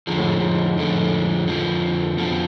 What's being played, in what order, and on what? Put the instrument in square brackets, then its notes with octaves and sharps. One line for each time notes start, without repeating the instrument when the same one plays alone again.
[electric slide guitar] F2 D3 F3 [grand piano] G#2
[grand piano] A2
G#2
A2
G#2
[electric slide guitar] F2 D3 F3 [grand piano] A2
[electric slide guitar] F2 D3 F3
[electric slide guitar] F2 D3 F3 [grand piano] B2